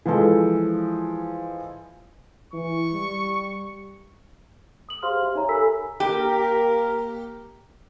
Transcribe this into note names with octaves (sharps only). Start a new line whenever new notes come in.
E3 F3 G#3 A4
E3 C#6
G3
D#6 F#7
G4 G#4 C5 F5 C6 F6
G4 E5
D#4 C#5 E5 A#5
A4 A#4 G#5 B5 E6 B6
A#3 G4 A#4